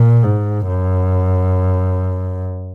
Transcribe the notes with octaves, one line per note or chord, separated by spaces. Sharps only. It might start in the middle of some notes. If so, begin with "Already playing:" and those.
Already playing: A#2
G#2
F#2